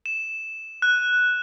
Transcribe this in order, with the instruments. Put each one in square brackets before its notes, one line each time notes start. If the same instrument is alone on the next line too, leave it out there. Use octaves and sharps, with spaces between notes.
[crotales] E7
F#6